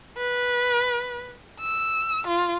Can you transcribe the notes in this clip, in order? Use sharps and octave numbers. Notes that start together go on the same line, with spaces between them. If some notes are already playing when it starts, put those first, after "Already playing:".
B4
E6
F4